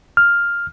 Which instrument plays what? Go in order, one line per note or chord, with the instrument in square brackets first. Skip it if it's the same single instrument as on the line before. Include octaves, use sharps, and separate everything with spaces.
[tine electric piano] F6